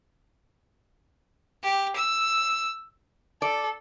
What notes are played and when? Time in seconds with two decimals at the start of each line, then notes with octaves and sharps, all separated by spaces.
1.63 G4
1.95 E6
3.42 A4 D5